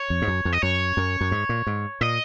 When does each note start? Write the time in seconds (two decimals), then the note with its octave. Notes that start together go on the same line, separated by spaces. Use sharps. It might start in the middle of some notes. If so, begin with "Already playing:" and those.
Already playing: C#5
0.10 F2
0.22 G#2
0.28 F#2
0.45 F2
0.53 D#5
0.63 F#2 C#5
0.97 F#2
1.21 F#2
1.32 G#2
1.49 A#2
1.67 G#2
2.01 A#2 D#5